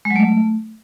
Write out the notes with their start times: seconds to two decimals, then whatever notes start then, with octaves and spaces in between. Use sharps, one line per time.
0.05 G#3
0.10 F#3
0.16 A3